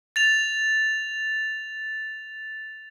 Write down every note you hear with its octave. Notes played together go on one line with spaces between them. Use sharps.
A6 F7